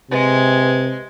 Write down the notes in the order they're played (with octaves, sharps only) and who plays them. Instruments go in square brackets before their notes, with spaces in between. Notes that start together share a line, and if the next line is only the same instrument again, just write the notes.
[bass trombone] C3 [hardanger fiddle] G#3 [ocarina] B4